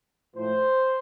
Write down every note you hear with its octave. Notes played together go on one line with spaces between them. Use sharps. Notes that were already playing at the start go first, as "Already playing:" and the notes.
A2 F3 C5